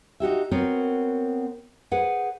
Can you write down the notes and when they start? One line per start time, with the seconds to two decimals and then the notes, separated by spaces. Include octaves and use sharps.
0.20 D#4 F#4 G4 E5
0.51 B3 C4 F#4 A#4 C5 C#5
1.91 G#4 B4 C5 F#5